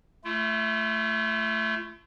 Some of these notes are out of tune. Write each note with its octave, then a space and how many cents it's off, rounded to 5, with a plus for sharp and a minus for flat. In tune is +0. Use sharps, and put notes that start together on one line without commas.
A3 +0 F4 -45